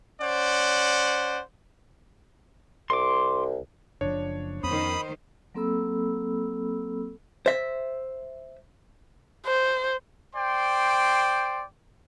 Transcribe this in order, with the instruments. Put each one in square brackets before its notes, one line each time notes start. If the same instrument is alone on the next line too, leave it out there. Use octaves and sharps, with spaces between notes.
[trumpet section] C#4 C5 D5 F#5
[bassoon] C2 [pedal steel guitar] C6 D6
[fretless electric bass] F#1 F3 [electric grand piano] D4 C#5
[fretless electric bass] F2 B3 C#4 [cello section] D#3 C5 [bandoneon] B5 D#6
[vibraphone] F#3 A#3 C4 A4 B5 E6
[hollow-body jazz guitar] C5 E5
[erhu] C5
[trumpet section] C5 D5 G5 C6